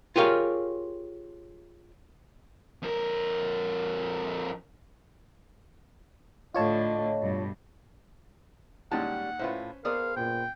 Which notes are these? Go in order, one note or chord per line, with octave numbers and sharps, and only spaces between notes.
F4 G4 G#4 A#4 C#5 F5
F2 A#4
A2 D3 F4 C#5 D#5 A5
G2 B2
A#2 D#3 G3 G#3 C#4 F#5 A5
A2 C#4 E4 F4 B4 C5
B3 G#4 A#4 C5 D5 F5 D#6
F#2 A#2 G5